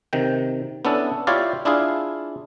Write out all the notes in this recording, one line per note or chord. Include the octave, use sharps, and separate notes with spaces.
C3 D#3 G5
B3 C#4 D4 E4 A4
E4 F4 G4 C#5 D5 F5
D4 E4 F4 G#4 F5